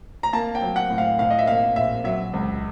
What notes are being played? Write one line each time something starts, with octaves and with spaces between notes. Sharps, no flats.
A#5
A#3 A5
G5
F#3
F#5
A2
F5
A2 F5
D#5
E5
A#3 F5
A#1 E5
F#3 E5
C#2